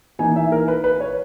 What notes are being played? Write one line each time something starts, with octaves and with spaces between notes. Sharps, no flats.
E3 A#3 D#4 G#5
E5
A#4
B4
B4
C#5